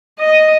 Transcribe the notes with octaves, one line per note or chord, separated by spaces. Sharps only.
D#5